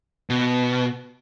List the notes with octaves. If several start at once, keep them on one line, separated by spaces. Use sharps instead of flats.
B2